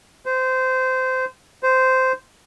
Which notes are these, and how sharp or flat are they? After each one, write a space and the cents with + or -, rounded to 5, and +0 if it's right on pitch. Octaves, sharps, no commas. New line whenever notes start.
C5 -20
C5 -10